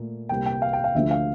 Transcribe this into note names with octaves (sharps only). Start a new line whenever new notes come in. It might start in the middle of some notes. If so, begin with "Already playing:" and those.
Already playing: A#2 A3
C2 C3 G3 A#3 G5
G5
F5
G5
F5
D2 D3 F3 A3 E5
F5